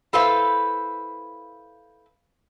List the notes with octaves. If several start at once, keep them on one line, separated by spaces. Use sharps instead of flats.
E4 A4 B4 C5 F5